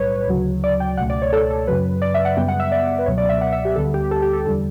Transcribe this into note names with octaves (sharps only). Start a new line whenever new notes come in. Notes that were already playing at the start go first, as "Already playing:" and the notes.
Already playing: B1 A2 G3 B4 C#5
D2 C#3 F#3
D5
G5
C#2 B2 A3 F#5
D5
C#5
A4
A4
F#2 C#3 F#3 B4
D5
E5
F#5
F#2 C#3 G3 B3 G5
F#5
E5
D5
B4
C#2 B2 F#3 B3 C#5
D5
E5
F#5
E5
G4
D2 D3 G3 B3 A4
G4
A4
G4
A4
E2 D3 G3 A4